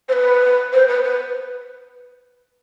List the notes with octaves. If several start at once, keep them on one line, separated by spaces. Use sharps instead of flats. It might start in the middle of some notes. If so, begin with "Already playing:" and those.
C5
B4
C5
B4
B4